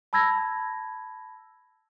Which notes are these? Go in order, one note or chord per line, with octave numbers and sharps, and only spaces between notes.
A5 B5 E6 G#6 A#6